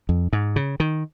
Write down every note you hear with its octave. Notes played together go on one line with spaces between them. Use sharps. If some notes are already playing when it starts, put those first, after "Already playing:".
F2
G#2
C#3
D#3